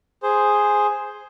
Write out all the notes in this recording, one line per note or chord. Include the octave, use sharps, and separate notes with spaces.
G#4 C5